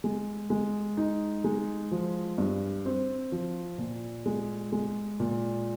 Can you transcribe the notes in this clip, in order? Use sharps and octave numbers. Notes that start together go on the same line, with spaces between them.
G#3
G#3
D#4
G#3
F3
G2
C4
F3
A#2
G#3
G#3
A#2